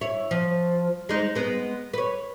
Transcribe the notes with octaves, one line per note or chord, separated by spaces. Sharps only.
E4 C#5
F3
G#3 D#4 C5
G#3 B3
B4 C#5